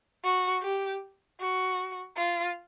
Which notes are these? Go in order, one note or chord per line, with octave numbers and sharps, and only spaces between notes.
F#4
G4
F#4
F4